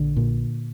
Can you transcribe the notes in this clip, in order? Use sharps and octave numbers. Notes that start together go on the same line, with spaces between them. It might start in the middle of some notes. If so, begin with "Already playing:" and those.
Already playing: A#1 D3
A#2